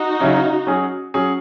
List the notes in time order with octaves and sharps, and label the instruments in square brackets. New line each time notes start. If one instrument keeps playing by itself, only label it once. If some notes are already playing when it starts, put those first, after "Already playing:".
Already playing: [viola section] D#4 F#4
[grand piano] C#3 F#3 C#4 E4
F#3 C#4 G#4
F#3 C#4 G#4